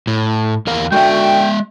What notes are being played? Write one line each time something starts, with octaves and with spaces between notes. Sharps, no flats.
A2
E2 A#4 F5
D3 G#3 F#4 E5 G5